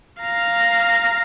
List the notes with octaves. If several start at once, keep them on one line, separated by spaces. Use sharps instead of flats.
F5 A#5